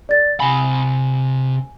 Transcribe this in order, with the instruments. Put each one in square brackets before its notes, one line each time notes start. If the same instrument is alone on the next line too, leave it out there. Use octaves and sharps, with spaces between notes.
[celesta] D5 A6
[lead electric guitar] C3 B5 [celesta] G#5